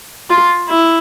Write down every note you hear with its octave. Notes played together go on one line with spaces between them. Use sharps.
F4
E4